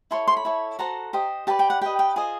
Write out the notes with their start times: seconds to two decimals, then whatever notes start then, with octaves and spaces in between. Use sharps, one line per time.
0.11 E4 A4 C#5 C6
0.28 C6
0.37 B5
0.45 E4 A4 C#5
0.79 F#4 A4 C5 A#5
1.13 G4 C5 D#5
1.47 G4 B4 D5 A5
1.59 G5
1.70 F#5
1.81 G4 B4 D#5 G5
1.99 G5
2.16 F4 G#4 C5 D#5 G#5